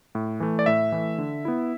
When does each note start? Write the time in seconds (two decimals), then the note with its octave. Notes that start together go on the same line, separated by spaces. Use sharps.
0.15 A2
0.40 E3 A3
0.59 D5
0.66 A2 E5
0.92 E3 A3
1.18 D3
1.45 B3 E4